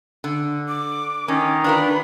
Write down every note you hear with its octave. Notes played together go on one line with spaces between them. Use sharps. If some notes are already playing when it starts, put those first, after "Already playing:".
D3
D6
D#3 C#4 D#4
D4 F4 A#4 B4